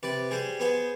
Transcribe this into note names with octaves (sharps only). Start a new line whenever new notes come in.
C3 B4 D5
G3 G#4 C5
B3 G#4 C5